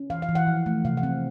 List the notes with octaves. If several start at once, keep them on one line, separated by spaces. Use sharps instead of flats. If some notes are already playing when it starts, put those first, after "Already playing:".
Already playing: C#4
E3 F5
F5
E3
F#5
F3
A3
C3 F5
F#5
C4